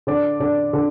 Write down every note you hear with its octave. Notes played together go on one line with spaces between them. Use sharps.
D3 D5
D3 D5
D3